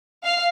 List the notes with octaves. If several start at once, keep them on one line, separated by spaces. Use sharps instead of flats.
F5